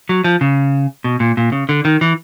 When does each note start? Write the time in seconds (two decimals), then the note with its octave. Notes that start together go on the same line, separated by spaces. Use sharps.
0.09 F#3
0.24 F3
0.41 C#3
1.04 B2
1.20 A#2
1.37 A#2
1.52 C#3
1.69 D3
1.85 D#3
2.01 E3